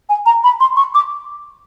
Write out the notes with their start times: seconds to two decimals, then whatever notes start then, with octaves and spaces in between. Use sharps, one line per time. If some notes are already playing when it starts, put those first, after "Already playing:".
0.09 G#5
0.26 A#5
0.44 B5
0.60 C6
0.76 C#6
0.95 D6